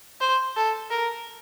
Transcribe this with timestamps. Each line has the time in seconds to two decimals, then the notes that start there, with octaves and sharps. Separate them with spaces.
0.21 C5
0.56 A4
0.90 A#4